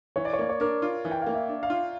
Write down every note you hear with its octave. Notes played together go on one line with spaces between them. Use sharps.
E3 C#5
D5
C#5
A#3 D5
C#5
D4 A#4
F4
E3
G5
A#3 F5
E5
D4
F5
F4